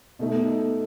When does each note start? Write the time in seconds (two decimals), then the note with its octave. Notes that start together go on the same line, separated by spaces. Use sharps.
0.19 B2 A3 D#4